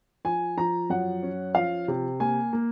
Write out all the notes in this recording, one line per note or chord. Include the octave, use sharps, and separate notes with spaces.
F3 G#5
F3 A#5
F#2 F#5
C#4
F3 F5
C3
A#3 G#5
A#3